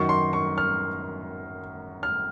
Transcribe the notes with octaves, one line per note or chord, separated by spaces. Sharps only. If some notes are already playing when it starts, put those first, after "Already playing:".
Already playing: F#2 D#3 F#3 C#6
C6
C#6
F6
F6